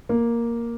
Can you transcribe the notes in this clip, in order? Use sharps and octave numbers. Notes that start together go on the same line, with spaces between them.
A#3